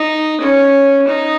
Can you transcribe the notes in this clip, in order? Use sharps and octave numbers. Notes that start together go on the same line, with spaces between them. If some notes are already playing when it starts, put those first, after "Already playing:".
Already playing: D#4
C#4
D#4